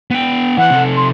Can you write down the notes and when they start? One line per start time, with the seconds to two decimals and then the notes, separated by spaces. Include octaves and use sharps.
0.10 B3 G5
0.58 E3 B3 F#5
0.70 C3 A4
0.96 C6